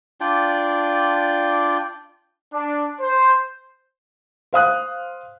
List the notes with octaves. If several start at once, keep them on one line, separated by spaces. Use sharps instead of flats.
D4 F4 D5 G5
D4
C5
C5 F5 D#6 F#6